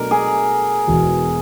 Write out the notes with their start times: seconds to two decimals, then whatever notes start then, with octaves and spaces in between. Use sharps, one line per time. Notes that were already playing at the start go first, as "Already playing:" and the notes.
Already playing: B2 F#3 A3 D4 A#4
0.11 G#4
0.87 E1 E2 B2